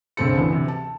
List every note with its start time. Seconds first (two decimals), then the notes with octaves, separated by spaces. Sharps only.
0.17 C#2 G2 A3 C4 A4 C#7
0.36 D2 E3 B3
0.50 D2 C3
0.68 A5